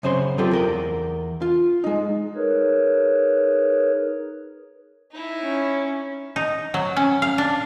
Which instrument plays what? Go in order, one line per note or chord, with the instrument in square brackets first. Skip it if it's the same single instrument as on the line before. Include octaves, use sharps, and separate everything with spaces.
[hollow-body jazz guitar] F#2 C#3 C5 C#5 C6
F#3 B3 C4 F4 G4 A4
E2 A#4 G5
F4
G#3 D#4
[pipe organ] D#4 G#4 A#4 B4 C#5
[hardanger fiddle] D#4 E4
[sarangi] C#4
[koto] D#4
F#3
C#4
F5
D4